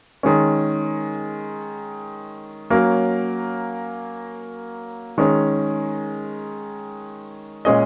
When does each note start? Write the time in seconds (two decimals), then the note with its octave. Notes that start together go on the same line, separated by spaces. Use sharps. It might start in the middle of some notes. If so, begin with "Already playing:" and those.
0.23 D#3 G#3 C#4
2.70 F#3 A#3 C#4 A#4
5.18 D#3 G#3 C#4
7.65 A#2 G#3 C#4 G#4 D#5